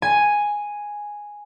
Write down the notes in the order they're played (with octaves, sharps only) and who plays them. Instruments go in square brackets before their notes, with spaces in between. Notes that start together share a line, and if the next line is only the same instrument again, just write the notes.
[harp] G#5